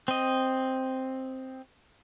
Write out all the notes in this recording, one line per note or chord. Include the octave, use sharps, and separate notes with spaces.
C4 D#5